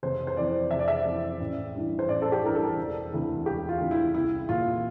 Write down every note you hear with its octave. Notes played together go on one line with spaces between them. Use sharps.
F1 C5
C5
F2 E3 D5
F1 E5
D5
E5
F2 E3
A1
G2 E3
C5
A1 D5
A4
G4
G2 E3 A#4
A4
E1
D2 C3 E3
E1 G4
F4
D2 C3 E3
E4
C2 E4
A#2 F4